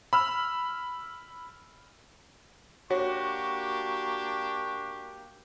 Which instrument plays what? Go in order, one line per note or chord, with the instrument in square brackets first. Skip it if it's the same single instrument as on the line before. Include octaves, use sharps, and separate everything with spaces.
[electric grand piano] B5 E6 F6
[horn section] A#3 D4 G4 [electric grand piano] F#4 [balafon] C#5 [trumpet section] C#6